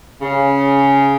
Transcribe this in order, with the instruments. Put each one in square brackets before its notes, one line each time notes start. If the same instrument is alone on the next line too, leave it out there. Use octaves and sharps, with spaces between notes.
[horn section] C#3